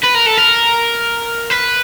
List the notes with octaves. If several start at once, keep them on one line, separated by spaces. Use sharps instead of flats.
B4
A#4
A4
A#4
B4